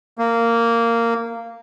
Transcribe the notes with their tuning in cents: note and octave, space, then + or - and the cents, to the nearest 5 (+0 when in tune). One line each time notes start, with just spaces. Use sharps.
A#3 -10